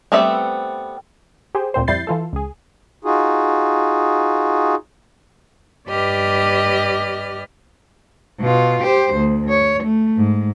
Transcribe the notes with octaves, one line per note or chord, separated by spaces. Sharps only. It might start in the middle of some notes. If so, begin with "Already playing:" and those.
G3 A3 B3 C4 E5
G4 G#4 C5
D2 A#2 C4 C5
F2 G3 E4 G6 A6 C7
E3 F4 A4
C#2 G#4
D#4 F4 F#4 G#4
G2 G4 B4 D5 D#5 F6
B2 F4
G4 C5
D2
C#5
A3
G#2